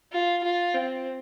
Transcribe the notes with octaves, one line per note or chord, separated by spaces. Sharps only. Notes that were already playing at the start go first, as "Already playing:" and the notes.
F4
F4
C4